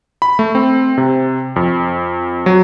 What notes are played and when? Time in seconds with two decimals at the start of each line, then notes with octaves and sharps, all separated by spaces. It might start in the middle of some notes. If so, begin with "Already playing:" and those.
0.22 B5
0.39 A3
0.55 C4
0.98 C3
1.56 F2
2.46 F#3